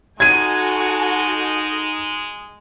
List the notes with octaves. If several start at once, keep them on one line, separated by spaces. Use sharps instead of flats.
G#3 D#4 F#4 A4 G#5 G#6 D#7